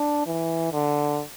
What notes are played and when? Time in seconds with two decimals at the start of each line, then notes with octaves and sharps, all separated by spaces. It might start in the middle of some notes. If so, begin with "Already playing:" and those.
Already playing: D4
0.27 E3
0.73 D3